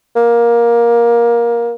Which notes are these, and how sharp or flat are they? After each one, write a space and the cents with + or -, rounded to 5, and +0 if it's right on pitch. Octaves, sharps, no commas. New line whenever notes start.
A#3 +15